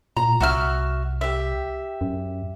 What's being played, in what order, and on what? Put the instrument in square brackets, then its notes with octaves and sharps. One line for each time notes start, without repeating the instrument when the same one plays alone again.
[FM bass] A#2 [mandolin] A#5
[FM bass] C2 [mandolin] F#4 E5 F6
[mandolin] G4 E5
[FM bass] F#2